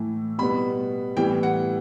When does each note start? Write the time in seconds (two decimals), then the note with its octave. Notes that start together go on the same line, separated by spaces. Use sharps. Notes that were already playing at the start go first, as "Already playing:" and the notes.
Already playing: A2 E3 A3
0.38 B2 G3 B3 B5
1.17 A2 E3 G3 B3 G5
1.43 F#5